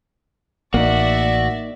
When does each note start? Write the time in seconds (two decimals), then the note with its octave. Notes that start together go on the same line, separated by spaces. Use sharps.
0.74 A1 A#3 D#4 F#4 D5 E5